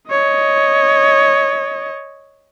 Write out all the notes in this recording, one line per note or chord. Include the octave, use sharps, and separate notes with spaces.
C#5 D#5